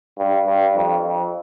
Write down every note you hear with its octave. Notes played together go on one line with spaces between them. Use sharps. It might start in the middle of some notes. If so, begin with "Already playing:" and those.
G2
G2
F2
F2